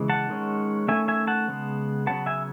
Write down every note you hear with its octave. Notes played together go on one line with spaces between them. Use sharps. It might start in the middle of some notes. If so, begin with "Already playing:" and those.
Already playing: C#3 E3 G#3
F#5 A5
D#3 G#3 C#4
D#3 A3 C#4 E5 G#5
E5 G#5
F#5 A5
C#3 G#3 B3
C#3 F#3 B3 F#5 A5
E5 G#5